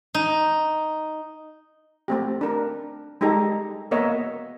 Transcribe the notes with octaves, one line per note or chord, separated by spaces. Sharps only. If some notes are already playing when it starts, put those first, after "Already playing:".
D#4
A3 C4 G4
D4 A#4
G3 G#3 D#4 G4 A4 A#5
A#3 B3 A#4 C#5 D#5 E5